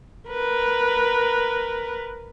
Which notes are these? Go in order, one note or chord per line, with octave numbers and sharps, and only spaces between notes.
A#4 B4